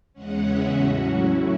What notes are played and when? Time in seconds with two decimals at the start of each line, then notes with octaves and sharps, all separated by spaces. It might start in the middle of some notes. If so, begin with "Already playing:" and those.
0.13 E2 C#3 G#3 C#4 F#5
0.44 E5
0.74 A2 F#3 C#4 F#4
1.04 E4